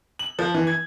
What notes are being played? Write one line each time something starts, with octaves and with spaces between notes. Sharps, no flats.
F#7
F3
E3
G#6